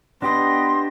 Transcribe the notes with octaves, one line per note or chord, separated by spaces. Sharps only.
B3 D4 G4 D#5 C6 A#6